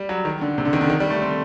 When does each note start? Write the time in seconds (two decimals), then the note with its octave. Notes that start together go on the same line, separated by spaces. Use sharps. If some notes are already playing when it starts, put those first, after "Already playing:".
Already playing: G3
0.09 F#3
0.25 D#3
0.41 D3
0.58 C3
0.65 D3
0.73 D#3
0.81 D3
0.90 D#3
1.00 G3
1.10 A3
1.22 C4